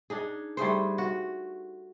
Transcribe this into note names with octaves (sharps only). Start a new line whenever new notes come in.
D4 D#4 G#4
G3 A3 G#4 C5
F#4